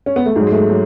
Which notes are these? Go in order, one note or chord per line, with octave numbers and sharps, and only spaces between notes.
C#4
B3
A3
G#2 F#3 G#3
G#3
A3
F#3